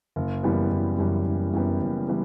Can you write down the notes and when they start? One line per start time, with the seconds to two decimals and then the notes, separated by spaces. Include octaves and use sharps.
0.16 F#1
0.43 F#2 E3 G3 B3
0.71 F#1
0.98 F#2 E3 G3 B3
1.26 F#1
1.53 F#2 E3 G3 B3
1.81 F#1
2.08 E3 G3 B3